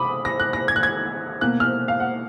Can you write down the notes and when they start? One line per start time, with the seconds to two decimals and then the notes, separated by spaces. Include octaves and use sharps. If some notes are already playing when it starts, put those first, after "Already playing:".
Already playing: B5 D6 D#6
0.25 A#6
0.40 F#6
0.53 A#6
0.68 G#6
0.76 F#6
0.83 G#6
1.41 B2 A#3 F#6
1.60 F6
1.88 F5
2.00 F#5